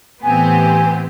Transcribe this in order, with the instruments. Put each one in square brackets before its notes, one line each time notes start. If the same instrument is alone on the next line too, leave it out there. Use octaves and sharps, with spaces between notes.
[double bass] A2 E3 [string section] B3 C4 G4 [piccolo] G#5